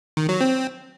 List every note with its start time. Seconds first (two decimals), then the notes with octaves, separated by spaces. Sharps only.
0.17 D#3
0.29 F#3
0.41 C4